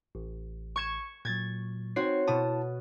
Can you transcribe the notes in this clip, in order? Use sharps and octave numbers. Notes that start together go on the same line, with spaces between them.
A1
C#6 G#6 E7
A#2 F#3 G#6 A6
C4 D#4 F#4 C#5 C7
B2 E4 A5 D#6